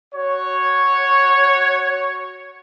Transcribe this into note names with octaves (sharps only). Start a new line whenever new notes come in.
F#4 C#5